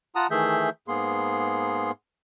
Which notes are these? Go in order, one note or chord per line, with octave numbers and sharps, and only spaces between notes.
F4 F#5 A5 A#5 D#6
D#3 E3 A3 G#4 E5 G6
G#2 A#3 B3 G#4 C6